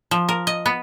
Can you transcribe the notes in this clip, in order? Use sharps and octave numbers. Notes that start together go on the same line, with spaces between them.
F3
A#4
D#5
B3